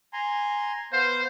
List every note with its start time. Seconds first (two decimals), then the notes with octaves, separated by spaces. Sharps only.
0.13 G#5 A#5 C6
0.92 B3 C5 F5